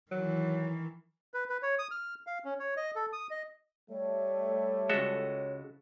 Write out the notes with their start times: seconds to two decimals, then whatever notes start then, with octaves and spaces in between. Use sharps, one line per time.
0.12 D#3 E3 F#3
1.34 B4
1.49 B4
1.63 C#5
1.79 D#6
1.91 F6
2.27 F5
2.45 C#4
2.59 C#5
2.77 D#5
2.95 A4
3.13 D#6
3.30 D#5
3.90 G3 A3 C#5
4.90 C#2 G#3 F#4 A4 E5